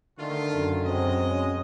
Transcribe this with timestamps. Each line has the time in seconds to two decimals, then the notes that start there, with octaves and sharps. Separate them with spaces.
0.19 D3 D#3 A3 F4
0.53 F#2
0.86 B2 G#3 C4 D#5
1.29 C#4